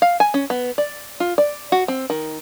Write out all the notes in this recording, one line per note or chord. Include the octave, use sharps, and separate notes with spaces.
F5
G#5
C#4
B3
D5
F4
D5
F#4
C4
D#3